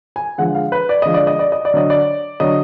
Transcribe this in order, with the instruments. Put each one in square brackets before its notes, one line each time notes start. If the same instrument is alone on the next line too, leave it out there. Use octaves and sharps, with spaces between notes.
[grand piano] G#5
D3 F3 G#3 F#5
F5
B4
D5
D3 F3 G#3 D#5
D5
D#5
D5
D#5
D5
D3 F#3 D#5
D5
D3 F#3 D#5